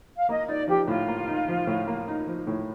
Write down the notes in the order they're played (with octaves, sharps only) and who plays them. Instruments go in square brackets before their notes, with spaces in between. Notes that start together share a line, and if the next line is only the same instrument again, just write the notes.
[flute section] F5
[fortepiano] A#3 [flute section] D#5
[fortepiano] D#4 [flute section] D5
[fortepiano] F3 [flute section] G4
[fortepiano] A2 [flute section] F4
[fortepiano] A#3
D#4
F3
A2
A#3
D#4
F3
A2